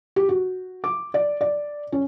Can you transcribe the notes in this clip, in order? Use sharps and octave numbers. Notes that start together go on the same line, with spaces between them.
G4
F#4
D6
D5
D5
C#4